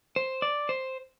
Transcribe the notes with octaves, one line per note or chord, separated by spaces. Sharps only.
C5
D5
C5